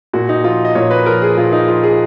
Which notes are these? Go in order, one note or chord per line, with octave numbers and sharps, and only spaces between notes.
A#2 F#4
D#4
F3 F4
D#5
A#2 C#5
B4
F3 A#4
G#4
A#2 F4
D#4
F3 F4
G#4